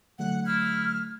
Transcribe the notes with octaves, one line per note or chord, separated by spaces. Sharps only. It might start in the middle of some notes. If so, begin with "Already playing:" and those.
D3 F#3 A3 F#5
E4 F6